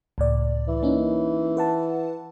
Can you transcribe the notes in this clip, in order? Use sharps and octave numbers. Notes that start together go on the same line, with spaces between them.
C#2 A2 D5
E3
A#3 C#4 D#4
B4 F#5 A5